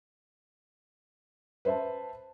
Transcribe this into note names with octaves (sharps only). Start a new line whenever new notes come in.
B4 C5 E5 A5